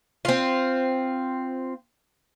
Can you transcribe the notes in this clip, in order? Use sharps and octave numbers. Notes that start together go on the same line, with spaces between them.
C4 F4